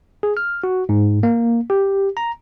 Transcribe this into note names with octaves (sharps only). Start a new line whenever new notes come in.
G#4
F6
F#4
G#2
A#3
G4
A#5